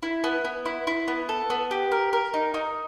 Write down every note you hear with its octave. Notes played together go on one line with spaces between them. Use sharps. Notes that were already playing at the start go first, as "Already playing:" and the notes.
E4
B3
B3
E4
E4
B3
A4
B3
G4
A#4
A#4
D#4
D#4